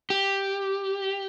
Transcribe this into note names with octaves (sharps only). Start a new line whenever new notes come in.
G4